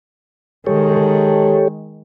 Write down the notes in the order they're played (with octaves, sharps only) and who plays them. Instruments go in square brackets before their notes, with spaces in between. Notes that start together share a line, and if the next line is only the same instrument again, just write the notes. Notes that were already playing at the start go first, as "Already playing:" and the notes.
[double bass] D#3 G#3 [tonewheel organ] G4 A4 C#5